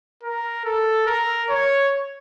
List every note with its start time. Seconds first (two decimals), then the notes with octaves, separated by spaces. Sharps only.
0.23 A#4
0.65 A4
1.06 A#4
1.49 C#5